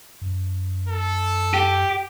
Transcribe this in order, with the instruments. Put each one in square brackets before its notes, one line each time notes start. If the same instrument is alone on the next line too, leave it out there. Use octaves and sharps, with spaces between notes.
[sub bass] F#2
[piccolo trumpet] A4
[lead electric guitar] G4